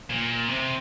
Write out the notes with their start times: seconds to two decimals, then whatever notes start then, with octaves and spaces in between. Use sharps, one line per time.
0.11 A#2
0.48 C3